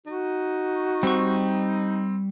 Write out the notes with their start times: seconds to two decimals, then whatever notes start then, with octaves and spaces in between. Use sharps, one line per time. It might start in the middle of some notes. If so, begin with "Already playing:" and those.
0.07 D#4 F#4
1.03 G3 C4 C#6